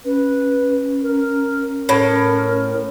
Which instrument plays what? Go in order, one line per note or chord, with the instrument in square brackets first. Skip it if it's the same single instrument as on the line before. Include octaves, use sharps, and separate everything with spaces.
[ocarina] C#4 [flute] B4
[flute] A#4
[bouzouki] A2 [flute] A#4